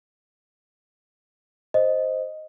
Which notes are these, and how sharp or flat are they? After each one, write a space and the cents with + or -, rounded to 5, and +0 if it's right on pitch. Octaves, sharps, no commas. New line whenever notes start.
C5 +0 D#5 +0